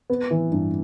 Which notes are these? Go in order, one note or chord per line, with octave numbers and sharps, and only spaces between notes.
B3
E3
G2